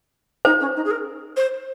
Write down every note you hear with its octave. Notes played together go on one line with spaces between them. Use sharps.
D#4 C5
C#4
D#4
G#4
A#4
C5